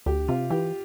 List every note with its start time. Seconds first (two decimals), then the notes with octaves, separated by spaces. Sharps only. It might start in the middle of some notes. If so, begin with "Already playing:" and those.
0.06 D2 G4
0.28 C3 F4
0.50 E3 G4